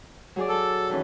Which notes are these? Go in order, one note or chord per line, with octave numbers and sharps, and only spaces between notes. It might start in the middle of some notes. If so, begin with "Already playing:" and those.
F#3 G#4 D5
A4
D#3 E3 C#4